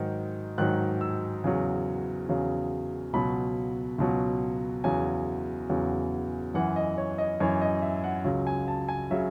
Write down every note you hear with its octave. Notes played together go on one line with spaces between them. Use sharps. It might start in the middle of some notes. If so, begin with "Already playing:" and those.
Already playing: G#2 D#3 F#3
G#2 D#3 F#3 F#6
E6
E2 C#3 F#3
E2 C#3 F#3
C#2 B2 F#3 B5
C#2 B2 F#3
E2 C#3 F#3 G#5
E2 C#3 F#3
F#2 E3 F#5
D#5
C#5
D#5
F#2 E3 C#5
D#5
E5
F#5
C#2 C#3 F#3
G#5
A5
G#5
C#3 F#3 E5